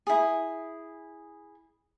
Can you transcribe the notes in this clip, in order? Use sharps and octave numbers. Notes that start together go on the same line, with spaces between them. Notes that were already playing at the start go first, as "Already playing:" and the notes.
E4 G#4